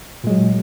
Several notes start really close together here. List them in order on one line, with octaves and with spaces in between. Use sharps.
A#2 G#3 F#3